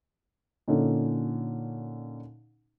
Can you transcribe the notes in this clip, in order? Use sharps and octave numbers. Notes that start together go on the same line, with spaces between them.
A#2 D3 C#4 D#4